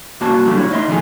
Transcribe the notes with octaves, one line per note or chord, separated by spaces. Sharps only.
C2 A#3 F#4 C#5 A5
A2 D3 F#3 G3 A3 A#3
E4 C#5
A3 D#4 D#5 E5 C6
D#3 F3 A3 D#4 F4 G#4